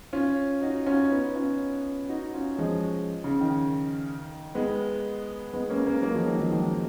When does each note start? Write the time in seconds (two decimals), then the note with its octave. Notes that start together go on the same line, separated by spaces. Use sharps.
0.13 C#4 F4
0.62 D#4 F#4
0.86 C#4 F4
1.11 B3 D#4
1.35 C#4 F4
2.09 D#4 F#4
2.34 C#4 F4
2.59 F3 G#3
3.24 C#3
3.41 D#3
4.55 G#3 B3
5.54 G#3 B3
5.70 A#3 C#4
5.86 A#3 C#4
6.03 F#3 A#3
6.15 F3 G#3
6.27 D#3 F#3
6.39 F3 G#3
6.52 D#3 F#3